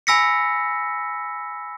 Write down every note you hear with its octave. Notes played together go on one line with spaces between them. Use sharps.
G#5 B5 E6 A#6 B6 C#7